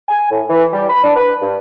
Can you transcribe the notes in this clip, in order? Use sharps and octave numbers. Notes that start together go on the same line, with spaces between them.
G#5
A2
E3
G3
B5
D4
B4
G2